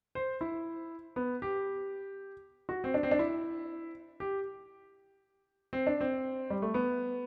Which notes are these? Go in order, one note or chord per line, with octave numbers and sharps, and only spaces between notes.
C5
E4
B3
G4
F#4
C4
D4
C4
D4
E4
G4
C4
D4
C4
G3
A3
B3